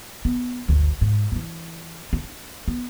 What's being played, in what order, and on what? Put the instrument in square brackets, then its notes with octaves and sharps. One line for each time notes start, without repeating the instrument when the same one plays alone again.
[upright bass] B3
G1 D2
G#2
E3 E4
D4
B3